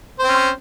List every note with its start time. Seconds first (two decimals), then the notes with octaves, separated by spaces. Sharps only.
0.19 C5
0.24 C4
0.28 C#4